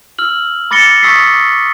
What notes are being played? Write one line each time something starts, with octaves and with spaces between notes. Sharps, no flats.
E6 F6 F#7
B5 D6 A6 A#6 C#7 G7
C#6 D#6 E6 A6 B6 C7